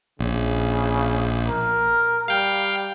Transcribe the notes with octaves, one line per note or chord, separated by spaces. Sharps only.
A#1 C#3
A#4
G3 F5 G5